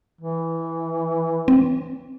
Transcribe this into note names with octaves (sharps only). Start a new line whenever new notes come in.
E3
C4